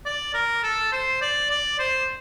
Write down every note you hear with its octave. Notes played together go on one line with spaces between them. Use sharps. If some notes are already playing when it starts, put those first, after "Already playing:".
D5
A#4
A4
C5
D5
D5
C5